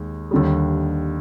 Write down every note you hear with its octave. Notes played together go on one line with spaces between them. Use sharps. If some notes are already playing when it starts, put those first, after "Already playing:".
Already playing: D#2 D#3 G#3
D#2 D3 G3